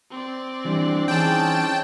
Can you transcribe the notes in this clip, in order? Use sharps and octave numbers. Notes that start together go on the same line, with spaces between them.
C4 D5
E3 G3 D4
E3 C#4 D#4 G#4 G5 A5